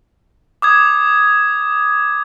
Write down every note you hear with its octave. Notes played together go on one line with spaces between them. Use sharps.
D6 D#6 G#6